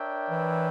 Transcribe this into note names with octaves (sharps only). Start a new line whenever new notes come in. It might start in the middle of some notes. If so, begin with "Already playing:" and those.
Already playing: D4 A#4 C#5 E5 G5
E3